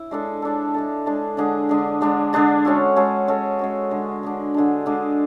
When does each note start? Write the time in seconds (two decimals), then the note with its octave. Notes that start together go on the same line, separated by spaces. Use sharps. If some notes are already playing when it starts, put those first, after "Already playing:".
Already playing: E4
0.11 G#3 D4 A4
0.42 G#3 D4 A4
0.74 G#3 D4 A4
1.06 G#3 D4 A4
1.37 D3 G#3 D4 G#4
1.69 D3 G#3 D4 G#4
2.01 D3 G#3 D4 G#4
2.33 D3 G#3 D4 G#4
2.65 G#3 C#4 F#4 A4
2.96 G#3 C#4 F#4 A4
3.28 G#3 C#4 F#4 A4
3.59 G#3 C#4 F#4 A4
3.91 D3 G#3 D4
4.23 D3 G#3 D4
4.54 D3 G#3 D4
4.86 D3 G#3 D4